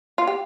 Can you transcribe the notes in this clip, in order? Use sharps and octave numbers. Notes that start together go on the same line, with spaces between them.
F4
G4